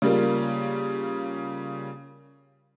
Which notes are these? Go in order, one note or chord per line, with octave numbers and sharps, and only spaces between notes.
C#3 G3 A#3 F4